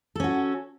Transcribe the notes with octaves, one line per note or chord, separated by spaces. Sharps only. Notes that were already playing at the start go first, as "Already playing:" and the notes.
C#4 F#4 A4